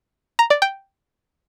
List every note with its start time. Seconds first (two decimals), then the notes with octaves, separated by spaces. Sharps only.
0.39 A#5
0.50 D5
0.62 G5